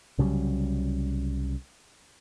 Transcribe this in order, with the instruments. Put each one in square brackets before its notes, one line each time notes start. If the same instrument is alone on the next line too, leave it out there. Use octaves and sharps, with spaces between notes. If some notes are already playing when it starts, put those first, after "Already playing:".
[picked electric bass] C2 C#3 F#3 G3